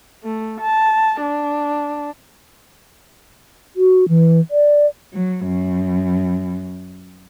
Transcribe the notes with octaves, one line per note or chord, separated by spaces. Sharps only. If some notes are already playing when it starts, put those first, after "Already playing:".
A3
A5
D4
F#4
E3
D5
F#3
F#2